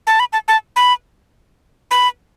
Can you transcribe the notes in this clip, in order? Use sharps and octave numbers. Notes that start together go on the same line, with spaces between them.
A5
B5
A5
A5
B5
B5